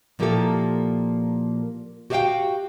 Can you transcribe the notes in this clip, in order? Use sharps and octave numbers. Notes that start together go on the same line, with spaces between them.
A#2 F3 A#3 E4 G4 A4
F#4 G4 D5 E5 F5 G5